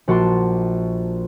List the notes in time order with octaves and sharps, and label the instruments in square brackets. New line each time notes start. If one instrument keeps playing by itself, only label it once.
[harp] A#1 F#4 A5 C6 D6